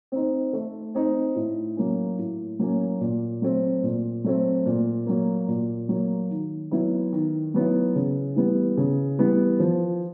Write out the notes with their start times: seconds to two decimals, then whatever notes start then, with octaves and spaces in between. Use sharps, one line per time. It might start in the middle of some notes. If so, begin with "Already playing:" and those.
0.12 C4 D#4
0.53 A3
0.95 C4 D#4
1.35 A2
1.77 F#3 A#3 C#4
2.18 A2
2.59 F#3 A#3 C#4
3.01 A#2
3.42 F#3 A3 C4
3.83 A#2
4.24 F#3 A3 C4
4.66 A#2
5.07 F#3 A#3
5.48 A#2
5.89 F#3 A#3
6.30 D#3
6.71 F#3 B3 E4
7.13 D#3
7.54 F#3 B3 E4
7.95 C#3
8.36 E3 G3 B3
8.77 C#3
9.19 E3 G3 B3
9.60 F3